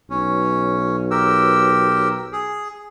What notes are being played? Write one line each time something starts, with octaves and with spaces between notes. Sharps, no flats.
B1 C#4
G4 A#4 E6
G#4